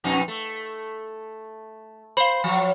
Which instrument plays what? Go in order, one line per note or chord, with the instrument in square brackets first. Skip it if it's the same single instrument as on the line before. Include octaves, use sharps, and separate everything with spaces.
[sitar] F2 B2 D#4
A3
[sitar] C5 [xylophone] F5 B5
[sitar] F3 F#3